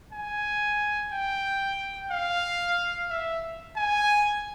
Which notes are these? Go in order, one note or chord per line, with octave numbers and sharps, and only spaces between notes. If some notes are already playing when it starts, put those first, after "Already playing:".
G#5
G5
F5
E5
G#5